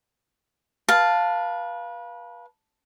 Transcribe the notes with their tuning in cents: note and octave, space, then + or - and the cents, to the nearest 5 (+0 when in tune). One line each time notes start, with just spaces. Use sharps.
B4 -35 F5 +0 A5 +0